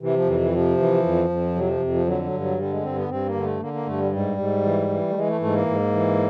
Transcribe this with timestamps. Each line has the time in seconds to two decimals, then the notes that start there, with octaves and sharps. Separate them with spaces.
0.01 C3 E3
0.14 F3
0.27 F2 E3
0.40 E3
0.52 C3 F3
0.78 E3
1.04 F2
1.29 F2
1.55 C3 F#3
1.68 F3
1.81 F2
1.94 F3
2.06 D3 F#3
2.24 F#3
2.32 G2
2.40 F#3
2.58 D3 G3
2.70 G#3
2.83 G2 C4
2.96 B3
3.09 G2 C4
3.26 A#3
3.35 D3
3.43 A3
3.60 D3 A#3
3.73 A#3
3.86 G2 A3
3.99 G3
4.12 G#2 G3
4.37 G#2
4.63 E3
4.89 E3
5.10 A3
5.15 E3 G#3
5.28 A3
5.40 G#2 A3
5.54 A#3
5.66 G#2
5.92 E3